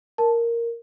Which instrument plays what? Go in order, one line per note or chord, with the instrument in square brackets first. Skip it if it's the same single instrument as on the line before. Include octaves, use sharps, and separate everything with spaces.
[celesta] A#4 A5